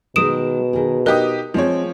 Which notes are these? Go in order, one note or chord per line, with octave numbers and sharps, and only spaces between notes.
B2 D#3 G#3 D#6 D7 E7
D#3 G#4
D#4 G4 A#4 D#5 D#6 F#6
F3 G#3 C4 C#5